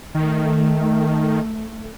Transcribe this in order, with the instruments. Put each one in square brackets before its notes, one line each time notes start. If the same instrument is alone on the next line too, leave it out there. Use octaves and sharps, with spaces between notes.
[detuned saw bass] D#3 [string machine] A3